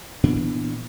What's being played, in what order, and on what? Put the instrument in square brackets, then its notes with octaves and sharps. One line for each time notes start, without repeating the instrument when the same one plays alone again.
[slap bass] A#2 E3 B3 D4